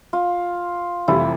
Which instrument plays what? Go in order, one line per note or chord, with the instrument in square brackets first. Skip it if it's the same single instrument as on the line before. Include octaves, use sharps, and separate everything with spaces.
[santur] F4
[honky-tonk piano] F1 F2 C3 E3 G3 [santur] E4